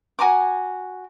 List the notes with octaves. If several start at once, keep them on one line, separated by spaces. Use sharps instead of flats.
F#4 G#5 A#5 D6